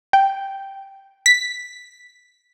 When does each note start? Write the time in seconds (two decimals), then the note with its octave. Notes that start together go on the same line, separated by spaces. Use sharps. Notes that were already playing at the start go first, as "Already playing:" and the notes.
0.13 G5
1.26 B6